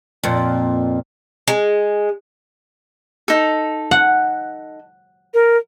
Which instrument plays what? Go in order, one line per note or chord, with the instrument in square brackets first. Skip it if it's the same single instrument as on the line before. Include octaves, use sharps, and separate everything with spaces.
[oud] F2 A#2
[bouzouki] G#3
[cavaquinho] D#4 A4
[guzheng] F#5
[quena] A#4